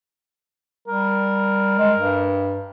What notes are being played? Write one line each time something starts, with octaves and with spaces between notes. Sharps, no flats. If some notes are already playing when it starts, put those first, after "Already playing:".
G3 A#4
G#3
G2